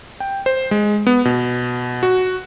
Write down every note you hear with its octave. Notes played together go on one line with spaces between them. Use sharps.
G5
C5
G#3
B3
B2
F#4